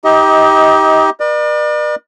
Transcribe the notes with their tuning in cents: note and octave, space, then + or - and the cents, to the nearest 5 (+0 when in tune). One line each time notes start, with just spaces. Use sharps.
D#4 +25 G4 +0 D#5 +35
B4 -45 D5 +40